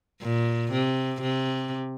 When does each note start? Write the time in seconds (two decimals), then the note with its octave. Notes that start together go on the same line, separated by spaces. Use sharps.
0.21 A#2
0.71 C3
1.21 C3